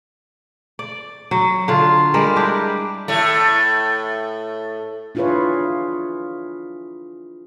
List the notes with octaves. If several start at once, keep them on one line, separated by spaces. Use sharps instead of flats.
D5
F#3
D3 F4
G3 G#3 A#4
D4 E4 G4
A2 A3
D4 E4 F4 G#4 B4 C#5